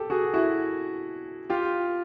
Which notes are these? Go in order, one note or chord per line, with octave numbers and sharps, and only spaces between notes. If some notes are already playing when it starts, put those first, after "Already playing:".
Already playing: G4 A4
F#4 G#4
E4 F#4
F4 G4